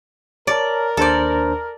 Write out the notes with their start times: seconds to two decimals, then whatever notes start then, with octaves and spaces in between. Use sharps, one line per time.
0.47 A#4 C#5 D5 A5
0.97 D#2 D4 A4 C5 D5